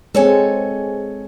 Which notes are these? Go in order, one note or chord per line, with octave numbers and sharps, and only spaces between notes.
G#3 C4 A4 C#5 G#5